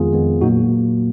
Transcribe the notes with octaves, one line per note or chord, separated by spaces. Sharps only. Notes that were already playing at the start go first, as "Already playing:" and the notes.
Already playing: F2 D#3 G#3 B3 F4 G#4
F2 D#3 G#3 B3
A#2 F#3 A#3 D#4 F#4